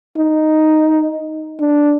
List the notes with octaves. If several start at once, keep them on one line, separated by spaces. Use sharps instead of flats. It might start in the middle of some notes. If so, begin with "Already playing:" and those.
D#4
D4